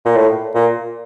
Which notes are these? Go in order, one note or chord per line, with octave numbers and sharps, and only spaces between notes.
A#2
A2
A#2